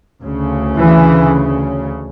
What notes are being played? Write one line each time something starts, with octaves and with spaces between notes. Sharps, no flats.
D2 C#3
E3